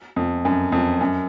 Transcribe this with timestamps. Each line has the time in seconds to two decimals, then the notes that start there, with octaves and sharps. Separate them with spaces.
0.16 F2
0.45 F#2
0.72 F2
1.01 F#2